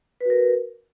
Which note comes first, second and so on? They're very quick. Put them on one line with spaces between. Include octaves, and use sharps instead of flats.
B4 F#4 A#4